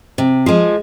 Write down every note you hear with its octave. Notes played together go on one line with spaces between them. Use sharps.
C3
F3 G#3